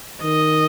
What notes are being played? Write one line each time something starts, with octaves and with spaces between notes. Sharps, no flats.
D#3 D#5